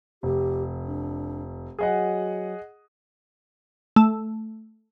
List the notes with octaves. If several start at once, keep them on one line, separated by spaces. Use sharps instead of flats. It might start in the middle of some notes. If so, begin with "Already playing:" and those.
F1 G4
D4
F#3 G#4 D#5 F#5
A3